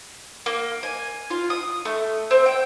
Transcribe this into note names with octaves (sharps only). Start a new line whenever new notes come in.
A#3
G#5
F4
D#6
A3
C4
G5